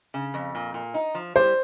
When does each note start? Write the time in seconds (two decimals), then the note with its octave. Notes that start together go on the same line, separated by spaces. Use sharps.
0.14 C#3
0.34 F2
0.55 A#2
0.74 A#2
0.94 D#4
1.15 F3
1.36 G3 C5